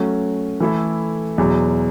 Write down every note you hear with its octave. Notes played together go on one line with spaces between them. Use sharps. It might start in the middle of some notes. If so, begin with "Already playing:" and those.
Already playing: F#3 A3 C#4 F#4
E3 A3 E4 A4
E2 B2 F#3